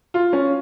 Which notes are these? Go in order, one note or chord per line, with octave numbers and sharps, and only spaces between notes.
F4
C#4